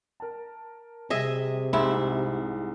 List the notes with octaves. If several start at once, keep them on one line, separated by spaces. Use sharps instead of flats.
A#4 A5
C3 G3 G#4 D#5 E5
C2 G#2 E4